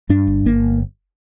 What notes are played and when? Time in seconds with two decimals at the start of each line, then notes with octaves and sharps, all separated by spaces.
0.09 G2 D4
0.27 G1
0.46 G1 A#3